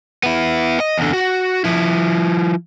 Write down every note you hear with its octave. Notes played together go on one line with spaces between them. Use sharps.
B3 E4
D#5
E2 D3
F#4
F3 E4